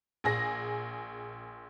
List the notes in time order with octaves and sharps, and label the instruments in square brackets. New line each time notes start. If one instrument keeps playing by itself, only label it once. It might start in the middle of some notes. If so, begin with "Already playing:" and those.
[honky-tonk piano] A#1 G#4 A#6